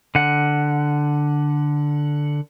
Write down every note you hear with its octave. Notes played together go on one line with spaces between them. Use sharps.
D3 F#5